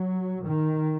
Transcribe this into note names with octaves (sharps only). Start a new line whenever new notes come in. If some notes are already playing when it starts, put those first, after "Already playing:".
Already playing: F#3
D#3